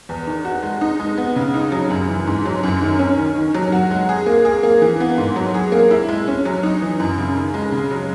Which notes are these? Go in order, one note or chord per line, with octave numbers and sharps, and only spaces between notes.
E2
D#3
F#4
G#3
D#4
G#3
B3
C#3
D#4
F#3
F#2
E3
G#2
F#3
F#2
D#3
C#4
D#3
D#3
F#3
F#4
G#3
G#4
A#3
G#4
A#3
E3
B3
G#2
F#3
G#4
A#3
E4
G#3
C#4
F#3
D#4
E3
F#2
C#3
D#3
G#3
C#3
F#3